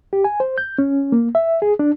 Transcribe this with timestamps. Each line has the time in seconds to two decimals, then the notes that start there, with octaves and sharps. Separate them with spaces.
0.13 G4
0.24 G#5
0.40 C5
0.58 G6
0.78 C#4
1.12 A#3
1.35 E5
1.62 G#4
1.79 D4